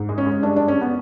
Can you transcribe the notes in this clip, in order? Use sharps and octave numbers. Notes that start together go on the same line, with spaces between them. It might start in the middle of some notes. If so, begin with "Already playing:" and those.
Already playing: G#2
G#3
C#4
G#3
G2 D4
G2 D4
C#4
B3